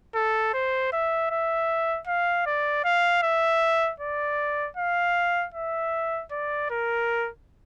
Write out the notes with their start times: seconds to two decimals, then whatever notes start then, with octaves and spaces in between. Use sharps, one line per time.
0.15 A4
0.54 C5
0.92 E5
1.30 E5
2.07 F5
2.46 D5
2.84 F5
3.23 E5
4.00 D5
4.77 F5
5.54 E5
6.31 D5
6.70 A#4